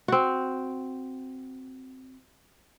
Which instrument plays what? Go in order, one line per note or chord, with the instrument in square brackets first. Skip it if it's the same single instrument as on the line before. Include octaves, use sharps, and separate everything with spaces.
[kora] C4 F#4